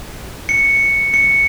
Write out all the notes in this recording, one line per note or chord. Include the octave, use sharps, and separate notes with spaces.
C#7
C#7